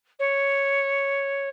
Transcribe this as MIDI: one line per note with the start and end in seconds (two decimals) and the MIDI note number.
0.19 1.49 73